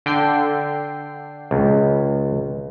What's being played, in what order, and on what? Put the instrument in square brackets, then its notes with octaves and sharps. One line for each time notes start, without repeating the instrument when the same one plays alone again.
[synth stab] D3 G5 C7
[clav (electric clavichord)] C#2